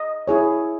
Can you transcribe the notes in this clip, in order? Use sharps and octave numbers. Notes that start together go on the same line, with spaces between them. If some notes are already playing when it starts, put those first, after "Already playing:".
Already playing: D#5
E4 G#4 C#5